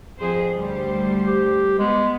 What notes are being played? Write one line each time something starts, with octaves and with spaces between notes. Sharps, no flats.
F2 G#4 C5
D2 G3 C5
G4
G#3 B3